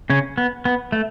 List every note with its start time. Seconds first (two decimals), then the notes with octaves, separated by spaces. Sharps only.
0.10 C#3 C#4
0.38 B3
0.65 B3
0.92 A3